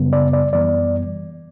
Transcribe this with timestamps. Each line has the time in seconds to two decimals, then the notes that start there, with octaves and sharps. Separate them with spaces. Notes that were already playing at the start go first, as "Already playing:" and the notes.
Already playing: F#2 C#3 G3 B3
0.13 D5
0.33 D5
0.53 F#2 E3 G3 B3 D5